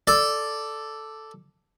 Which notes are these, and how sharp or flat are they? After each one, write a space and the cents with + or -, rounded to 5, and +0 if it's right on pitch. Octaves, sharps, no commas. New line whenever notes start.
A4 +0 D5 +0